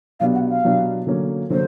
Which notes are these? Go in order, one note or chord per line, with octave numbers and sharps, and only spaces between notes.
B2 F#3 B3 D4 G4 F5
F#5
F5
B2 F#3 B3 D4 G4
D3 F#3 A#3 C#4
D3 F#3 A#3 C#4 C5